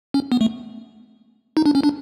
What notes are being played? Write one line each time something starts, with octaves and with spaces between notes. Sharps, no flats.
C#4
B3
A3
D#4
D4
C#4
D4